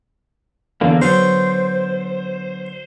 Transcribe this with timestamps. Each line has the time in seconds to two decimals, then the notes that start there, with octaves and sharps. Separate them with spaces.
0.81 E2 D3 A#3
1.02 D3 F#3 B3 C5